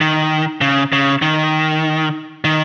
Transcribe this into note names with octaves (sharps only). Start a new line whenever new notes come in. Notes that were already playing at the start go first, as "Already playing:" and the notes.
D#3
C#3
C#3
D#3
D#3